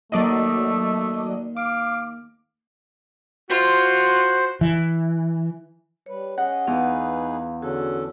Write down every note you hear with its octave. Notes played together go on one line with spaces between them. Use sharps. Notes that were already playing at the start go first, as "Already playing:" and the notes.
D#2 F#3 A3 D5 D#5
F5 D6
F4 F#4 C5
E3
G3 B4 C#5
C#4 G#4 D#5 F#5
E2 D#4 G#4 B4 F5 B5
D3 C#4 F#4 G#4 A4